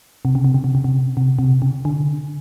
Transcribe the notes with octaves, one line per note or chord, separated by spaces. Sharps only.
C3
C#3
C3
C#3
C3
C#3
C3
C3
C3
C#3
D3